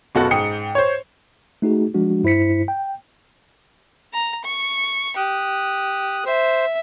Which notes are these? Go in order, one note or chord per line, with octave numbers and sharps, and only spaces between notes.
F#1 B2 F#4 A4 F#5
G#2 G5 D#6 C#7
C5 C#5
A3 D#4 F#4 G#4
F3 G#3 D4 F#4
G2 E4 C5 B6 C#7
G5
A#5
C#6
G4 D#6 F#6
C5 E5